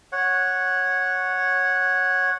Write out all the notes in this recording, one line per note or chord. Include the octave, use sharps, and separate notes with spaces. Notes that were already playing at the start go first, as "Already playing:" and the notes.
C#5 F#5